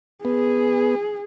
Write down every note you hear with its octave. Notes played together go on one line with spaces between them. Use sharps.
B3 G#4